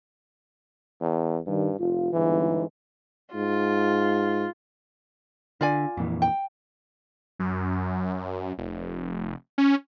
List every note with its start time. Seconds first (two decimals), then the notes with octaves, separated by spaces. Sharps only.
1.01 E2
1.47 G2 D#3 G3
1.80 F1 F4
2.13 G1 C#2 G#2 E3
3.34 G#2 F4
5.61 D3 F4 D5 G#5
5.97 F2 A#2 E3
6.22 G5
7.39 F#2
8.58 F1
9.58 C#4